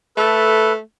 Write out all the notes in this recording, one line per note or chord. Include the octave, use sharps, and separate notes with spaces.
A3 A4 B4